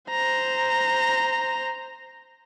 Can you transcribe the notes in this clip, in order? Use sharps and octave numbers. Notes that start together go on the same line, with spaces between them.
C5 A#5